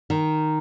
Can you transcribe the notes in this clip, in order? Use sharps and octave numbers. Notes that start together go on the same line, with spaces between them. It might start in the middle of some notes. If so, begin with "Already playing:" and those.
D#3